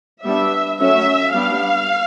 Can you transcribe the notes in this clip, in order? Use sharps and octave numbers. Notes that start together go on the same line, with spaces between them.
G3 B3 D4 E5
F#3 A3 C#4 E5
G3 B3 D4 F5